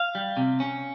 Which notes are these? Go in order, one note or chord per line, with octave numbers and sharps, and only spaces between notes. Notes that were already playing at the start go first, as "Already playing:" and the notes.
Already playing: F5
G3
C3
C#4